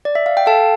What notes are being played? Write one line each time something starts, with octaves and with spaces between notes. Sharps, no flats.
D5
E5
F5
G5
A4 F5 A5